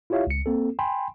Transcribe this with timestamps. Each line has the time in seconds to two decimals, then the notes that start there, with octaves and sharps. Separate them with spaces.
0.10 E4 F4 G4 C#5 E5 F5
0.27 C#2 C#7
0.46 A#3 C4 A4
0.79 G5 G#5 B5 C6